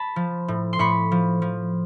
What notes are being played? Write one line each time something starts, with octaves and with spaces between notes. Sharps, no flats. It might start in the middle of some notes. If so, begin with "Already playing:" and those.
Already playing: A5 B5
F3
A2
C6
A2 B5 C#6
F3
F3